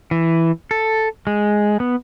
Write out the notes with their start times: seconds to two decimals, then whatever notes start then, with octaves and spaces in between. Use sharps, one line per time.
0.11 E3
0.71 A4
1.27 G#3
1.80 B3